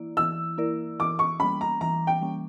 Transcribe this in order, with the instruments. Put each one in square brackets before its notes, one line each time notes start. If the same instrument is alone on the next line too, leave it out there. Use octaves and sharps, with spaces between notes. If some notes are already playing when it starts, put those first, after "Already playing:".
Already playing: [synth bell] E3 A#3 E4 D5
[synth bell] E3 [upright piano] E6
[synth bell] A#3 E4 A#4 D5
[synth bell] E3 [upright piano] D6
[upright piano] C#6
[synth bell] G3 A#3 C#4 [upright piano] B5
[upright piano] A#5
[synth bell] E3 [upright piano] A#5
[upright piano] G5
[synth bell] G3 A#3 C#4